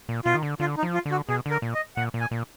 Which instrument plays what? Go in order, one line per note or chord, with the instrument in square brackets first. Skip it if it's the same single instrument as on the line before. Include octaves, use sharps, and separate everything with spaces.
[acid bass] A#2
[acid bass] B2 [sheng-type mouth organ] F4
[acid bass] D#3
D3
[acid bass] D3 [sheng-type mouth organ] F4
[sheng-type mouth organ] D#4
[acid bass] F3
[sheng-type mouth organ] F4
[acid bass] D3
[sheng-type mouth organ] F#4
[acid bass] B2 [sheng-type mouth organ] G#4
[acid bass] D3 [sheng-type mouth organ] A#4
[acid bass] A#2
[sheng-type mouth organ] D#5
[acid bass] A#2 [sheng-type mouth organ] F#5
[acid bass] A#2
[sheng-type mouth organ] G#5
[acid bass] A#2